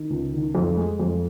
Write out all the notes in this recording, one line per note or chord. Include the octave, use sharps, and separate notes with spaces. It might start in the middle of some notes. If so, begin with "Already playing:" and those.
Already playing: D#3
C#2
D#3
F2
G#3
F2